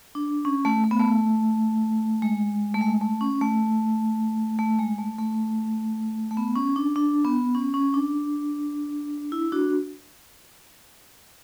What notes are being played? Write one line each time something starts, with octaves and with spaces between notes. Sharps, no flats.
D4
C#4
A3
A3
B3
A3
G#3
A3
G#3
A3
C#4
A3
A3
G#3
A3
A3
A3
B3
C#4
D4
D4
B3
C#4
C#4
D4
E4
D4 F#4